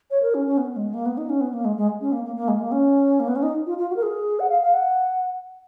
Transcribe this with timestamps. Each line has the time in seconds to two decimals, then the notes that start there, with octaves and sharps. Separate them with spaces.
0.11 C#5
0.22 A#4
0.34 C#4
0.46 C#4
0.58 B3
0.76 G#3
0.94 A#3
1.06 B3
1.18 D#4
1.29 C#4
1.41 B3
1.53 A#3
1.65 G#3
1.77 G#3
2.01 C#4
2.12 A#3
2.24 A#3
2.36 A#3
2.48 G#3
2.60 A#3
2.72 C#4
3.20 A#3
3.28 B3
3.36 C#4
3.43 D#4
3.66 F4
3.78 F4
3.90 F#4
3.96 A#4
4.03 G#4
4.40 F#5
4.50 F5
4.62 F5
4.74 F#5